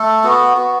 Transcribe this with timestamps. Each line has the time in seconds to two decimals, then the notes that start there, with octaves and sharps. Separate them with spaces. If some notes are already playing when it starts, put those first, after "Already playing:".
Already playing: A3 A4
0.23 B3 F#4
0.57 B3 F#4